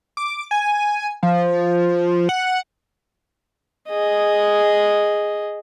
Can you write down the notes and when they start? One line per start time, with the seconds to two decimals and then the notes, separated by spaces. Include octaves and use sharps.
0.17 D6
0.51 G#5
1.23 F3
2.29 F#5
3.90 G#4 D#5